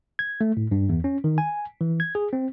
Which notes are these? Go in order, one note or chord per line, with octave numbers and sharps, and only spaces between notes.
G#6
A3
A2
G2
E2
C#4
D#3
G#5
E3
G#6
G#4
C4